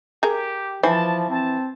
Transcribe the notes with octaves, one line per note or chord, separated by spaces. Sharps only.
G4 G#4 A#4
E3 F3 C5 A5
C4 A5